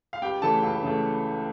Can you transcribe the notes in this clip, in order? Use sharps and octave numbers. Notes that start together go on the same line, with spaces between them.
F5
C#2 G4 G5
C#3 E3 A3 A4 A5
C#2
C#3 E3 A3